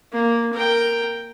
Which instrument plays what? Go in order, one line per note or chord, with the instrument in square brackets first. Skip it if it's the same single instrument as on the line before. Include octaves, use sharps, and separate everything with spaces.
[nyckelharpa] A#3
A#4 G5